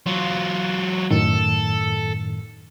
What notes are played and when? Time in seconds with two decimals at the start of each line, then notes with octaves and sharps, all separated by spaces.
0.06 F#3 F4
1.11 F#2 A2 D#3 A4